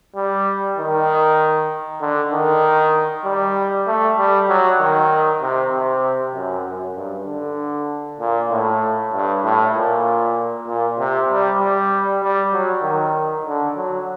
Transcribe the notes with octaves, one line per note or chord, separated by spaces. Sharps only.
G3
D#3
D3
D#3
G3
A3
G3
F#3
D#3
C3
C3
F#2
F#2
G2
D3
A#2
A2
G2
A2
A#2
A#2
C3
G3
G3
G3
F#3
D#3
D3
F#3